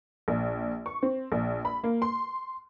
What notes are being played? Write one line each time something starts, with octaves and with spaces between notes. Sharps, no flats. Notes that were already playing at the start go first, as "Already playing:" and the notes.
A#1
C#6
C4
A#1
B5
A#3
C6